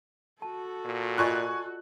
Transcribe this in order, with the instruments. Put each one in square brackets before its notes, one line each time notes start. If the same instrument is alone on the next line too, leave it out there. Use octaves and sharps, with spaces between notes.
[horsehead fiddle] F#4 A4 [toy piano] A5
[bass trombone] A#2
[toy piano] F4 D5 D#5 [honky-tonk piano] G#5 C#6 F#6